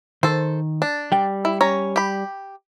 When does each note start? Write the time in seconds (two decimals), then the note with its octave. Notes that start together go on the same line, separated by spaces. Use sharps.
0.23 D#3 A4 C5
0.82 D4
1.12 G3 G5
1.45 E4
1.61 C#4 C#5 A#5
1.96 G4 B5